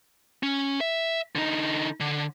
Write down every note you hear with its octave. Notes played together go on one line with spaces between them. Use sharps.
C#4
E5
D3 D#4
D3